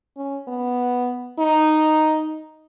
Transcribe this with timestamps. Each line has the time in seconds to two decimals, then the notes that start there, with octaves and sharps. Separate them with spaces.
0.17 C#4
0.48 B3
1.39 D#4